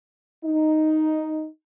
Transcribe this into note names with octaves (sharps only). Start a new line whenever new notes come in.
D#4